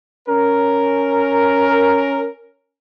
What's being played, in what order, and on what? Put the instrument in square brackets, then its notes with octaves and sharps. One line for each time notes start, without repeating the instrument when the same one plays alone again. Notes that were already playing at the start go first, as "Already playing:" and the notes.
[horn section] C#4 A#4